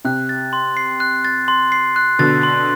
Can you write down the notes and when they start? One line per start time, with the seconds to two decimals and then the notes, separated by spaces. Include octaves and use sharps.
0.05 C3 F#6
0.29 A6
0.53 C6
0.77 C7
1.00 F#6
1.25 A6
1.48 C6
1.72 C7
1.96 F#6
2.19 B2 D3 A6
2.43 C6